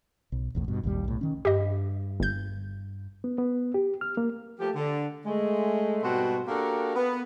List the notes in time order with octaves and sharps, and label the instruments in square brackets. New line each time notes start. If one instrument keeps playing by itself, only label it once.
[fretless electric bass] B1
G#1 E2 A2
G2 B2
G#1 D#2 A#2 G3
B1 A2
D#3 C#4
[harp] G2 [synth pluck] G4 D#5
[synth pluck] G1 G6
[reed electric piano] B3
B3
G4
F6
A#3
[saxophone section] F3 A3 A#3 G4
D3
G#3 A3
G#2 B2 G3 C4 F#4
A#3 D4 F#4 G4 A4 A#4
B3